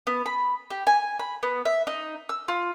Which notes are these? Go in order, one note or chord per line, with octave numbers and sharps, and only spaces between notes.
B3
B5
G4
G#5
B5
B3
E5
D#4
E6
F4